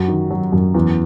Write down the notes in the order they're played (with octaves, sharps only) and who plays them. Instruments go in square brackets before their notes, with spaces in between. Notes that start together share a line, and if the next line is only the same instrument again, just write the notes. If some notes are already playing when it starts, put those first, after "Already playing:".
Already playing: [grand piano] F#2 F#4
D#3
F#3
F#2
E2